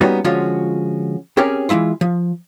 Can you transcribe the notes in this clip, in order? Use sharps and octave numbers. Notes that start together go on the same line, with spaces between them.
G3 A#3 B3 C#4 D#4 F#4
D3 F3 G#3 C#4 F4 F#4
C4 C#4 G4 G#4 A#4 C#5
E3 F3 G#3 E4 F4
F3